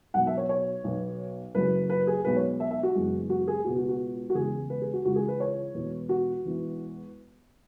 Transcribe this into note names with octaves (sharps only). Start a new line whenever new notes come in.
B1 B2 F#3 B3 F#5
E5
C#5
C#5
B1 B2 B3
F#1 F#2 C#3 F#3 B4
B4
G#4
B1 B2 G#3 B4
C#5
E5
E5
F#4
F#1 F#2 E3 G#3 B3
F#4
G#4
C#2 B2 G#3 B3 F#4
F#4
F#4
F#4
E1 E2 C#3 G#3 G#4
B4
G#4
F#4
C#2 C#3 E3 G#3 F#4
G#4
B4
C#5
E1 E2 B2 B3
F#4
E1 E2 E3